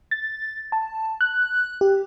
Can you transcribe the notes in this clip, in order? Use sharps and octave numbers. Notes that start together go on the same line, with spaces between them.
A6
A5
F#6
G4